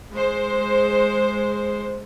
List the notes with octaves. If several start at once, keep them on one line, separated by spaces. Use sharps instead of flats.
G#3 C5